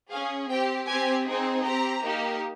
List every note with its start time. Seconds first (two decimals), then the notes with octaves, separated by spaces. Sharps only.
0.11 C#4 G#4 F5
0.49 C4 G4 G5
0.88 C4 G4 G#5
1.26 C4 D#4 G#4
1.64 C4 G4 A#5
2.03 A#3 D#4 G4